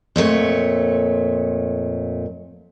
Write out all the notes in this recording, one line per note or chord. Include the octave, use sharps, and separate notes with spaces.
F2 A#2 A3 C#5